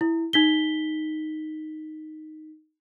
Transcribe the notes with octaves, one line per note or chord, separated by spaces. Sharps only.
E4
D#4 B6 G7